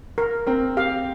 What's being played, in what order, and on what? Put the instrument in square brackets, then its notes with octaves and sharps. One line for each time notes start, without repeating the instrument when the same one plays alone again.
[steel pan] A#4
[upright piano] C4 [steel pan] A#4
[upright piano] G4 [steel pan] F5